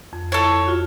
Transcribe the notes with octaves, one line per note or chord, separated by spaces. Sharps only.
F2
E4 A4 C#5
F4 F#4